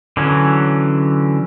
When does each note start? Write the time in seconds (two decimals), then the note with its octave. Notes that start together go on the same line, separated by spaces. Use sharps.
0.17 D3 E3 F#3 C#4